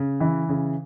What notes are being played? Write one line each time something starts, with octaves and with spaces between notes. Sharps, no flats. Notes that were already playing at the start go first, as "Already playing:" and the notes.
Already playing: C#3
E3
C#3